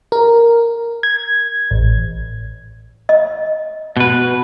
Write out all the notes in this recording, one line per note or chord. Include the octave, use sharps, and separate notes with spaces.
A#4
G#6
A1
D#5
B2 B4